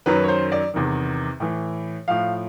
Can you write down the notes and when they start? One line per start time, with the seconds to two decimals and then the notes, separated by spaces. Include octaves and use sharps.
0.06 F#2 D#3 F#3 B4
0.24 C#5
0.28 C5
0.52 D5
0.74 E2 C3 D#3
1.40 A2 E3
2.08 A2 F3 F5